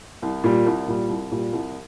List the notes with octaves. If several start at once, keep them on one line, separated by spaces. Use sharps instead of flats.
C2
A#2 G3
C2
A#2 G3
C2
A#2 G3
C2